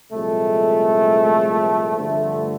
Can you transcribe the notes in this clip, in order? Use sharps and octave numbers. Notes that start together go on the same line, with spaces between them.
C2 A#2 F3 G#3 A3
G2 D3 F3 A3